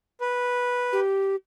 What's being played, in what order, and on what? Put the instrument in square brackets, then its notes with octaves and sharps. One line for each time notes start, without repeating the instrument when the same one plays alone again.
[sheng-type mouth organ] B4
[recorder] G4